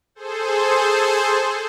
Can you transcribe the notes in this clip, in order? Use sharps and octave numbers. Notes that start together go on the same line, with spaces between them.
G#4 A4 C5